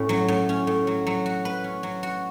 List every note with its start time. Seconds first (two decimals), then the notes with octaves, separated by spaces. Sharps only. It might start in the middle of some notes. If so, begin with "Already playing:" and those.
Already playing: A2 C#4
0.09 F#3
0.28 A2
0.49 C#4
0.67 A2
0.87 F#3
1.07 F#3
1.26 F#4
1.45 B4
1.64 C#4
1.83 F#3
2.03 F#4